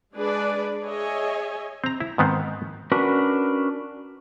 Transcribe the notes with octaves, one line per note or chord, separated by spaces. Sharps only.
G#3 D4 G#4 B4 D5
G#4 C#5 D#5 E5 G#5
C4 A#5
E4
G#2 D#3 B3 C4
C#4 D4 F#4 A#4 B4